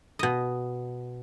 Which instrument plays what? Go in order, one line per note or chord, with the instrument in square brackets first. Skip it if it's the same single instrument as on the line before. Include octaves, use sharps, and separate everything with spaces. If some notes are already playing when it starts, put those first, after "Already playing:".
[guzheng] B2 D#5